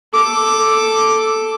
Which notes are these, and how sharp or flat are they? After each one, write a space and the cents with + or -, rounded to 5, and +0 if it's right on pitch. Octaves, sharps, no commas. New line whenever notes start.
A4 +0 D6 +0